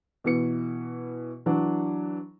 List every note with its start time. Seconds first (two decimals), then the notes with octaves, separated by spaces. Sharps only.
0.24 B2 E3 C#7
1.46 E3 F#3 D4